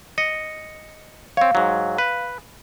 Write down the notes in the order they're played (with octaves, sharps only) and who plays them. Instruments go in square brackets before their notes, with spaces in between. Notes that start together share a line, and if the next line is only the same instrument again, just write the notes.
[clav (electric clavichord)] D#5 [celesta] C#7
[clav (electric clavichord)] C4 C#5 [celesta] F5
[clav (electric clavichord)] G#2 F#3
B4